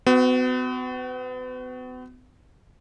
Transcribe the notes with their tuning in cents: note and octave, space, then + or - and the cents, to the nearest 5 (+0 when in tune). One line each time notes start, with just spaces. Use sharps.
B3 +40 F#4 +0